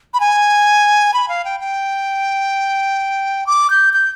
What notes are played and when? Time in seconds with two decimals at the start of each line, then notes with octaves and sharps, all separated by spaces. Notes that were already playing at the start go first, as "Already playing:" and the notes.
0.14 B5
0.20 G#5
1.14 B5
1.29 F5
1.45 G5
1.60 G5
3.47 D6
3.70 G6
3.93 G6